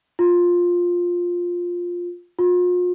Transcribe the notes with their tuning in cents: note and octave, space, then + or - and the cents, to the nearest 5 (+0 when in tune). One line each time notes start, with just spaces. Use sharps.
F4 +10
F4 +40